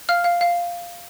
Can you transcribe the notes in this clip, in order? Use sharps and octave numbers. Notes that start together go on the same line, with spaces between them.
F5 F6
F5
F5